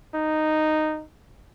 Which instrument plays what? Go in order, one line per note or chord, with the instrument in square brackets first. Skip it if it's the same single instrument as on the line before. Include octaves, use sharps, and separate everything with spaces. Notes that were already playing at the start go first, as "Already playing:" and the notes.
[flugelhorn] D#4